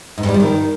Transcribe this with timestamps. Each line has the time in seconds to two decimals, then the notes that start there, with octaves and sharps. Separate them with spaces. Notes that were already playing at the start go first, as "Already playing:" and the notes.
0.18 G#2
0.23 G2
0.29 G3
0.34 F3
0.40 D#3